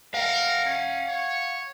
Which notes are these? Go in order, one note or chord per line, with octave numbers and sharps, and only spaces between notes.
A#4 F5 F#5
C#4
C#5